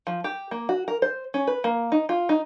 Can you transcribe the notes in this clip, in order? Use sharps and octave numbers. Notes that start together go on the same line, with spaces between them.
F3
G4
A#3
F#4
A#4
C5
C#4
B4
A#3
D#4
F4
D#4